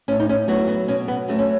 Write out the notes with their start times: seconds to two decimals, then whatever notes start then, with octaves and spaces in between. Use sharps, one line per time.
0.08 A2 C#4
0.20 D#4
0.29 C#4
0.48 F#3 A3 B3
0.68 B3
0.88 B2 C#4
1.08 B3
1.28 F#3 A3 C#4
1.39 C#4